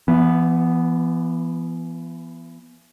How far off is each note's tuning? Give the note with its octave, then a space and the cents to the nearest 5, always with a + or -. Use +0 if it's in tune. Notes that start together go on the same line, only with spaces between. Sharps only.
E3 +40 B3 +0